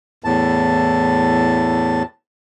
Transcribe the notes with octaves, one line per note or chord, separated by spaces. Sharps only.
E2 A2 A5